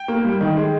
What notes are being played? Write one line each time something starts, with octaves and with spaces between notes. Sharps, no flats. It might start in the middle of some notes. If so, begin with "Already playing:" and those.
Already playing: G5
A#3
G3
D#3
G#3